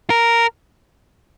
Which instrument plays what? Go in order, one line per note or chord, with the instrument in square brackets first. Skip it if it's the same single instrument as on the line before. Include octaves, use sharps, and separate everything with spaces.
[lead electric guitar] A#4